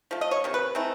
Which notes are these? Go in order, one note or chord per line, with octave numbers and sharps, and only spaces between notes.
D3 F3 A3
D#5
C#5
C3 D#3
B4
E3 A3 C4 D#4